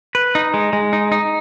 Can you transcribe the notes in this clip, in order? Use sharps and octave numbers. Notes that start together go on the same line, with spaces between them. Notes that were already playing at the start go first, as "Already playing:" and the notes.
B4
D#4
G#3
G#3
D#4
D#4